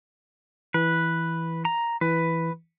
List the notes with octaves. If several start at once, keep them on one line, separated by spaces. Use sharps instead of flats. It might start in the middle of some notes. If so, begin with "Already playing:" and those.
E3 B4
A#5
E3 B4